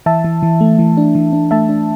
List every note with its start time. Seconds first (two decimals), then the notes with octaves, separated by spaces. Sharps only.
0.06 E3 E5 A5
0.24 E3
0.43 E3
0.61 A3
0.79 E3
0.97 D4
1.15 E3
1.33 D4
1.51 A3 E5 A5
1.69 D4